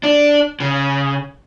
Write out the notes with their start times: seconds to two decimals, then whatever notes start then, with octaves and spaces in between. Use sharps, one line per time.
0.03 D4
0.60 C#3